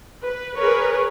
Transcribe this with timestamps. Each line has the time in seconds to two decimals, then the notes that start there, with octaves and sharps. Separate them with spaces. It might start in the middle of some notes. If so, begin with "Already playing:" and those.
0.24 B4
0.55 G#4 A#4 B4 C#5